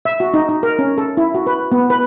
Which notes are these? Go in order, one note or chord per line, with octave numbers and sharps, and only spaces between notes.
E5
F#4
D#4
D#4
A#4
C#4
A4
E4
F#4
B4
B3
B4